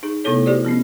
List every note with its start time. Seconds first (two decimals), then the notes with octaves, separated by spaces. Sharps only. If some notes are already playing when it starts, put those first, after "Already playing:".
0.03 D#4 G#4
0.24 C3 A3 B3 E4 A4 C#5
0.46 E4 F#4 G4 C5 D5 D#6
0.65 F3 B3 C#4